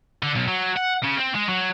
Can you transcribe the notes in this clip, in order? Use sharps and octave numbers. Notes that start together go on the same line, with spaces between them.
D3
B1
F#3
F#5
C#3
C4
G#3
F#3